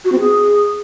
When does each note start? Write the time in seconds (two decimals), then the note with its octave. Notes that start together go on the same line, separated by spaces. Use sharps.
0.05 F#4
0.12 C4
0.20 G#4